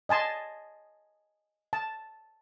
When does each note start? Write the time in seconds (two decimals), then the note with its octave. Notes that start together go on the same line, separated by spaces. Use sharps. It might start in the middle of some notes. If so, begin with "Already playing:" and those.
0.09 D#5 G#5 A5 C6
1.73 A5